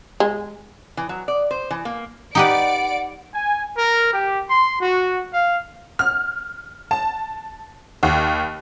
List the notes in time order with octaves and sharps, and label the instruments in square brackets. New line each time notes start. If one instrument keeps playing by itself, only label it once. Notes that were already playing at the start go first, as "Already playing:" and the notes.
[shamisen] G#3
[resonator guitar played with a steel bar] E3
F#3
D5
C5
E3
A#3
[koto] D#4 G4 B4 [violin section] D5 D7 [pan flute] F#5
[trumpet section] G#5
A#4
G4
C6
F#4
F5
[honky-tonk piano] F6
A5
D#2